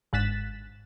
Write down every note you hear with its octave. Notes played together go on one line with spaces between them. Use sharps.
G1 G#2 F#6 A6 B6 E7